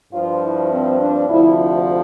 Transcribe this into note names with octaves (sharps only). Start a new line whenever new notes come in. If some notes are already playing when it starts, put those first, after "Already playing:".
G2 F3 F4
E4
C4
D4
D2 C3 F3 E4